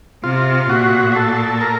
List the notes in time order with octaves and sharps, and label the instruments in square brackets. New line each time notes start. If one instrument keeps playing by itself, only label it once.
[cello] C3 [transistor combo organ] F4
[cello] A#2 [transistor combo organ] F#4
[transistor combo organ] F#4
A4
A#4